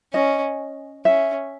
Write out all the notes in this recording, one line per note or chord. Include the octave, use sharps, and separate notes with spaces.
C#4 D#5
C#4 E5